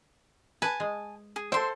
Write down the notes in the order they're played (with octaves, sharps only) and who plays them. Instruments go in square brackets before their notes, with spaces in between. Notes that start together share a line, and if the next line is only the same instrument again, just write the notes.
[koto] B4 [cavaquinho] G#5 A5
[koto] G#3
[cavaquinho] G#4
[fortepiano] A4 C5 [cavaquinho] E5 C6 [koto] G5